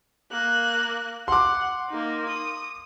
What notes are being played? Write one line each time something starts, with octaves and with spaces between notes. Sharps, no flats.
A#3 F#6
F#5 C6 D6
A#3 D#4
D#6